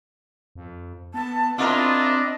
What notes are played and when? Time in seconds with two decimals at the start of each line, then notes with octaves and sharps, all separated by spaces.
0.55 F2
1.14 B3 A5
1.58 C4 D4 E4 F4 A#4 D#5